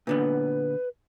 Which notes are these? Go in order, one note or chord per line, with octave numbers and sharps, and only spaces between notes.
A#2 D3 B3 B4